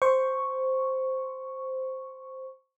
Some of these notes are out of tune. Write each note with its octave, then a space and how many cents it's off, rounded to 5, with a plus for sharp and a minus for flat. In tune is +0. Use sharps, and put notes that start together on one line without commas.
C5 +0 C#6 +0